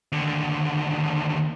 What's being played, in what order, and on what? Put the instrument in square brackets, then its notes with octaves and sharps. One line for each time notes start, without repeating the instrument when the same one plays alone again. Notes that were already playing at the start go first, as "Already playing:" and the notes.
[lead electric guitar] D#2 D3